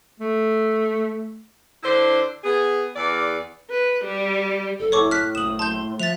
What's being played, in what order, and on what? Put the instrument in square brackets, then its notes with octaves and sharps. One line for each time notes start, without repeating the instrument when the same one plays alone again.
[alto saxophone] A3
[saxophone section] D3 D4 E4 C5
B3 G#4
E2 D5
[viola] B4
G3
[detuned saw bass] F#1 [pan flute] A4
[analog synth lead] A2 [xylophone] C#5 C#6 D6
[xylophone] F6 B6 [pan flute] F#6
[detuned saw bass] F#1 [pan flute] D#6 [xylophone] E7 F#7
[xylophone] A5 G6 [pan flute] C6
[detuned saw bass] F3 [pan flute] E5 [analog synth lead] F#6 [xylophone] A6 F7